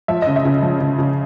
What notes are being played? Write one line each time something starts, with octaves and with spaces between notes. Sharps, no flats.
F3 E5
D#5
C#3
E5
C#3
F3
C#3
C#3